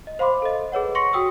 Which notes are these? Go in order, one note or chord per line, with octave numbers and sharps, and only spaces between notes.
D#5
C5 F5 B5 C6 D6
A4 D#5
G#4 B4 C#5 F#5
C6 C#6 A#6 C#7
F#4 G5 D#6 E6